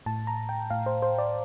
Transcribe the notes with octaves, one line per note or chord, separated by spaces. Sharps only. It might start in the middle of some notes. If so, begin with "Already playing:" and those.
A2 A5
A#5
G5
A2 F5
C5
C5
D5